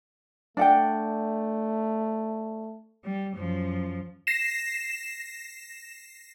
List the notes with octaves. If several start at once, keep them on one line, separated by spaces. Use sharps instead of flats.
A3 D4 F#5 G5
G3
F#2 F3
A#6 C7 E7